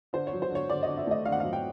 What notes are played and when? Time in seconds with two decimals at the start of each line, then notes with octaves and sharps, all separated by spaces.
0.13 D3 C5
0.27 C#5
0.33 F#3
0.42 C5
0.50 D3 C#5
0.70 D3 D5
0.83 D#5
0.88 D3
0.97 E5
1.07 A3 D#5
1.25 D3 F5
1.32 F#5
1.40 F#3 F5
1.53 G5